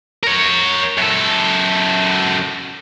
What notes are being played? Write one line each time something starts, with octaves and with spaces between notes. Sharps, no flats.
A#4 C#5
F#2 A4